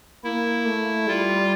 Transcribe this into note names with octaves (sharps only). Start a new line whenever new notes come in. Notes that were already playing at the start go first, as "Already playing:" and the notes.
A#3 E4
A3
G3 F4